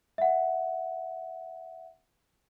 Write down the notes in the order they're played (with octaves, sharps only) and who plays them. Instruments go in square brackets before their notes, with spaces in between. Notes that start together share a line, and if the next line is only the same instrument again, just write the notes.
[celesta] E5 F#5